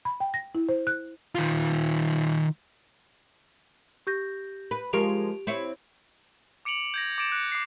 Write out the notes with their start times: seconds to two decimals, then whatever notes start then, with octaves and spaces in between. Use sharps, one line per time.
0.05 B5
0.20 G5
0.34 A#6
0.55 E4
0.69 C5
0.87 F#6
1.35 D#3 F4
4.07 G4 G6 A#6
4.71 B4
4.93 F3 G#3 G4 A#4 D7 F7
5.47 C4 E4 C#5
6.65 D6 C#7 D7 F7 F#7
6.94 G6 G#6 A#6
7.18 D6 A6 D7 E7
7.32 F#6 C#7
7.52 D6 C7